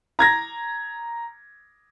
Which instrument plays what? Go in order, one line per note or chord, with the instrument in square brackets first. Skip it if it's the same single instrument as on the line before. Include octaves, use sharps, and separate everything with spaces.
[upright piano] A#5 G#6 A#6